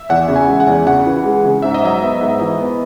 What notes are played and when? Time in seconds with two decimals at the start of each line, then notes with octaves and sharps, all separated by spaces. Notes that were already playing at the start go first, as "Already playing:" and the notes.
Already playing: E5
0.09 E2 F#5
0.28 C#3
0.36 G#5
0.48 G#3
0.60 F#5
0.66 E2
0.86 C#3 F#5
1.06 E3
1.24 G#3
1.44 C#3
1.62 G#2 E5
1.74 D#5
1.83 F#3 E5
2.02 B3
2.21 G#2
2.40 E3 D#5
2.60 B3